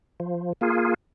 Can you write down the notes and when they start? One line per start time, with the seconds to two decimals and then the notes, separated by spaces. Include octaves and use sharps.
0.20 F3
0.61 A#3 F4 G#4